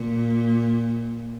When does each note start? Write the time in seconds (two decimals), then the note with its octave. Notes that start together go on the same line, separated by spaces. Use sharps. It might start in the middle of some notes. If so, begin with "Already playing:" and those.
Already playing: A#2